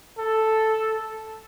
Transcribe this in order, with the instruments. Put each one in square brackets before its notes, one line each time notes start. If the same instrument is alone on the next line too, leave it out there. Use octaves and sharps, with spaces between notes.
[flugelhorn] A4